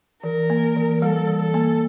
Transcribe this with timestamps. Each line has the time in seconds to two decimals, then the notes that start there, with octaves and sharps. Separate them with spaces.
0.23 E3 A#4
0.50 A#3
0.76 E3
1.02 G3 A4
1.27 E3
1.41 A4
1.54 A#3